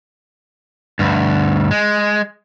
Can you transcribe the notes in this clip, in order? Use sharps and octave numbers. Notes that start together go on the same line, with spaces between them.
D2 G2
G#3